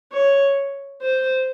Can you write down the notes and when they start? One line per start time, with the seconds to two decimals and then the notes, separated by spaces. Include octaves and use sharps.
0.12 C#5
1.02 C5